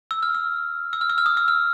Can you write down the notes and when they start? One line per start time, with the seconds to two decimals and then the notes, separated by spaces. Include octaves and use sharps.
0.11 E6
0.23 F6
0.35 E6
0.93 E6
1.01 F6
1.10 E6
1.18 F6
1.26 D#6
1.37 E6
1.48 F6